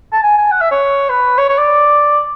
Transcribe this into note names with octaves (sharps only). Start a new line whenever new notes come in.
A5
G#5
G#5
F#5
E5
C#5
B4
C#5
C#5
D5